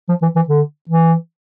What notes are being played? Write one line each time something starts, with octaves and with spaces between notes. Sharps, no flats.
F3
E3
E3
D3
E3